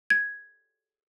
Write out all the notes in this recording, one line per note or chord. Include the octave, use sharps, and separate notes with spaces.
G#6